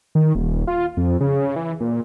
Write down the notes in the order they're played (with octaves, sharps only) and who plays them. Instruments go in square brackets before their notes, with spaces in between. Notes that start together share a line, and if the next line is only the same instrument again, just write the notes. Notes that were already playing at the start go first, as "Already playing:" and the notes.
[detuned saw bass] D#3
D#1
F4
F2
C#3
E3
A#2